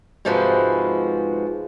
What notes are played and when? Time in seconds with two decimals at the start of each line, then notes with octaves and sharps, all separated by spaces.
0.25 G#2 C3 F3 G#3 F#4 B4